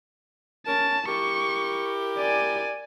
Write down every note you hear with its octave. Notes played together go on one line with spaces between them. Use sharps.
C#4 A#4 C#5 A5
E4 G4 A#4 C#6
D5 G#5